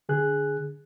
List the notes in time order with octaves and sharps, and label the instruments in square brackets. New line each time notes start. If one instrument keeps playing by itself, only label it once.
[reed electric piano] D3 G#4 F#6